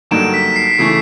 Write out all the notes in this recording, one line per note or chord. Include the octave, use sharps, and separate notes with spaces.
G2 D3 F#3 A#3 D#4 D7 E7
B6
C7
B6
C#3 E3 A3 C7